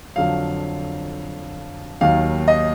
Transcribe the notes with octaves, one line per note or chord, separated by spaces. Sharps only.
F2 D3 F#3 F5
D#2 D#3 F#3 F5
D#5